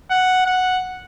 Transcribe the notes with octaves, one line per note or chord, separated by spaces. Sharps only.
F#5
F#5